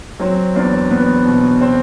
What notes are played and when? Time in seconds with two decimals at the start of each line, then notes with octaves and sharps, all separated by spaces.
0.20 F#3 C4
0.55 E2 D4
0.91 E2 B3
1.26 B2
1.61 C4